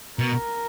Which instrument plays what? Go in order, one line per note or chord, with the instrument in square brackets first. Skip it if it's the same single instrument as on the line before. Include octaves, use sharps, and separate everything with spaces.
[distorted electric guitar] B2 [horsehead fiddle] A#4